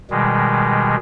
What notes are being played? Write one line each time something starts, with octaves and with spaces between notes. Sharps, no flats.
B2 D#3 G3 G#3